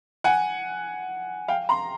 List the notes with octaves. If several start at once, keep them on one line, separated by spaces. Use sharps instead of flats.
F#5 G#5
F5 G5
A#5 C6